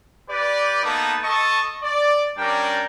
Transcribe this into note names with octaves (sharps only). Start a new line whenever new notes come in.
G4 B4 D5
A#3 B3 D#4 A4 A5
A4 D#5 A5 C#6
D5
G3 C#4 D4 A#4 G5